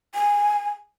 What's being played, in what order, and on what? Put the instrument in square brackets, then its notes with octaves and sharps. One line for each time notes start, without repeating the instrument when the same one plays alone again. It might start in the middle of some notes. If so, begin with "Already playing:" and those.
[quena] G#5